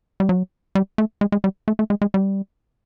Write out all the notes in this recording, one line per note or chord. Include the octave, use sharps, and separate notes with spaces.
G3
F#3
G3
A3
G#3
G#3
G3
A3
A3
G#3
G#3
G3